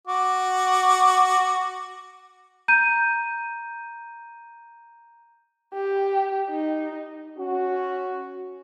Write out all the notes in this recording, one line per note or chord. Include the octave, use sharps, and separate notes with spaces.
F#4 D6
A#5 G6 D#7
G4
D#4
C#4 F#4